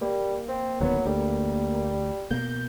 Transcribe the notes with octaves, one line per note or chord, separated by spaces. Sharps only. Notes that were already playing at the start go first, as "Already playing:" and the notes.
G3 A#3
C4
D1 D#3 F#3 B3
D2 G3
B2 A#3 G6